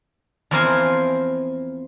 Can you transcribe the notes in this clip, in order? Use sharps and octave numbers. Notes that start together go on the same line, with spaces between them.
E2 F3 C4 A#4 C5 G#5